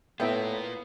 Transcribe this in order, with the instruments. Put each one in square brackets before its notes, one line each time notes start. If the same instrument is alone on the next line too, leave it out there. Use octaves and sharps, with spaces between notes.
[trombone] A2 [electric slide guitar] A#3 F4 [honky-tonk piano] B3 [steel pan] E4 E5 G5